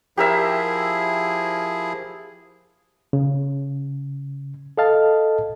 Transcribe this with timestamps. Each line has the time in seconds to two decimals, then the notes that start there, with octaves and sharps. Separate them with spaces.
0.17 F3 E4 G4 G#4 A#4 E5
3.13 C#3
4.78 A4 D#5 F5 A5